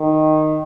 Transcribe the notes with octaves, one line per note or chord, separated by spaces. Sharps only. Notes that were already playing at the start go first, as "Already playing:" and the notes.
Already playing: D#3